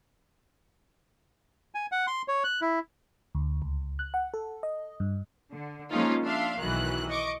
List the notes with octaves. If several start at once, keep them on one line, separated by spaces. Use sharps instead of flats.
G#5
F#5
C6
C#5
F#6
E4
D2
C#2
F#6
F#5
A4
D#5
G2
D3
F3 G#3 A#3 C#4 D#4 F4
D4 E5 F5 C6
B1 D#3 E3 F#3 F#6
D#5 C#6 D6